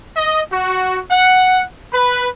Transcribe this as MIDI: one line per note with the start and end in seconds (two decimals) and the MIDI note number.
0.17 0.42 75
0.51 1.00 66
1.11 1.63 78
1.93 2.28 71